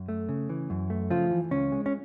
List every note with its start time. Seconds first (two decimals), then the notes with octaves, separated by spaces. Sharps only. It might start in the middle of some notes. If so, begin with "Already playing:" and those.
Already playing: F#2
0.09 A3
0.29 C#3
0.49 E3
0.70 F#2
0.90 A3
1.10 C#3 F3 F4
1.31 E3
1.51 C#2 C#4
1.72 G#3
1.86 C#4